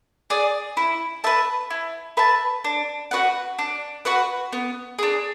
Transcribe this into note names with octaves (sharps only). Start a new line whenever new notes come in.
G#4 D5
E4
B4 E5 A5
E4
B4 E5 A5
D4
F#4 B4 F#5
D4
F#4 B4 F#5
B3
D4 G#4